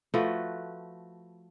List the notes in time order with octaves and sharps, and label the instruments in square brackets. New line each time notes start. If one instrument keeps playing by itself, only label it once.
[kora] F3 A3 F#4 B4